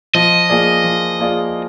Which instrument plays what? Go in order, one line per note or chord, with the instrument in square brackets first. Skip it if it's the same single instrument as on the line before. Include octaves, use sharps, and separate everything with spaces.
[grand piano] F3 [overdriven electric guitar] D#5
[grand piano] A#3 F4 G#4 D5
F3
A#3 F4 G#4 D5